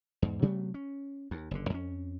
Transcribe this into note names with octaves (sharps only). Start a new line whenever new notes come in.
E2 G#2
C3 F#3 A3 B3
C#4
D#2
F#1 D3
F2 C4 C#4